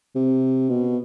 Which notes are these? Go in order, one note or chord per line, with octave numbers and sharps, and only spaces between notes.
C3
B2